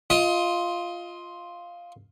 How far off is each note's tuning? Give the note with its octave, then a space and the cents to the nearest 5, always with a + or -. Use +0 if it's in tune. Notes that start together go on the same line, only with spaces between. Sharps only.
F4 +0 D#5 +25